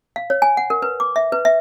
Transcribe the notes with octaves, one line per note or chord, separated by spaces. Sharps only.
F5
C#5
G#5
F#5
A#4
B4
D6
E5
B4
E5